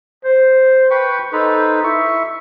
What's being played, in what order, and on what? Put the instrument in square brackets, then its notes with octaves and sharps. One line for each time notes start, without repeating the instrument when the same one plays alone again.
[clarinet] C5
[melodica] B4 G5 C#6
[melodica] D#4 B4 C5 [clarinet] A4
[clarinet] E4 [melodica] E5 C#6